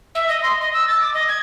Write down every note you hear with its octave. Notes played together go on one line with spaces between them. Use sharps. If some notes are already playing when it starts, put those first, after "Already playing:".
E5
D#5
C6
D#5
E6
A6
D6
D#5
G#6